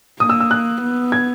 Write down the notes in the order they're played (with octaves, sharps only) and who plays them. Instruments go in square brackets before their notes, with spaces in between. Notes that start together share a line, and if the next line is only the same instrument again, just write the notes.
[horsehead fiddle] A#3 [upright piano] D#6
[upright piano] E6
E6
F#6
[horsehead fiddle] B3
[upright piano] G#6